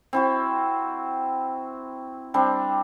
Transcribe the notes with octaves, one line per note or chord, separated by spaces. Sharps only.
C4 E4 F#4
G3 C4 D4